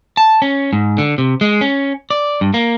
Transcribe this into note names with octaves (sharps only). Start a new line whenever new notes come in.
A5
C#4
G#2
D3
C3
G#3
C#4
D5
G2
A#3